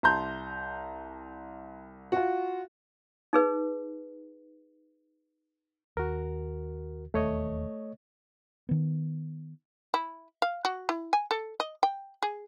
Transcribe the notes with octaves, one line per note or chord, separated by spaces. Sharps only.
C2 A5 A#5 C6 G6
F4 F#4
D#4 G#4 B4
D#2 F#4 A#4
E1 D#2 A3 C#5 D#5
D#3 B3
E4
F5
F#4
E4
G#5
A4
D#5
G5
G#4